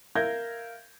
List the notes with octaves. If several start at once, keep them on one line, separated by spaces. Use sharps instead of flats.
A#4 E5 F5 G6 G#6 A#6